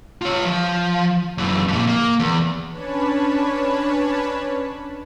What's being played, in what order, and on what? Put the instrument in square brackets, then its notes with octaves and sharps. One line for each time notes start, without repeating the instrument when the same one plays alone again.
[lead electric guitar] F4 C#5
F3
F#2 E3
F2 A#2
A#3
E2
[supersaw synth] C#4 D4 B4 C#5 A5 B5